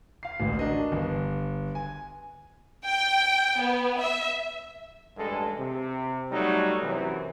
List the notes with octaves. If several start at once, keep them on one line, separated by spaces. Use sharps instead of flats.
F5 C7
A1 D2
D4 F#4 A#4 D#5
G1
G#5
G5
B3
E5
A1 G2 G#3 A4
C3
F#3 G3 A3 D#4
F#2 C3 E3